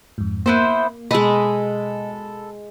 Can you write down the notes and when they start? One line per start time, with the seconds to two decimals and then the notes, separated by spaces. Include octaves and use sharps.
0.18 F2 G#2
0.46 A#3 B3 E4 C5
1.11 B2 G#3 A4 B4 D#5